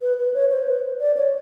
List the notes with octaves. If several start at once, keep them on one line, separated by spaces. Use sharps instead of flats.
B4
B4
C#5
C5
B4
D5
C#5